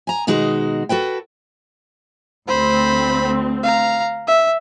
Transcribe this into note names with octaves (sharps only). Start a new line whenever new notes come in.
G#5 A#5
B2 D#3 G#3 D#4 F#4
F#4 A4 B4 G5
D2 C4 C5 B5
F5 A#5
E5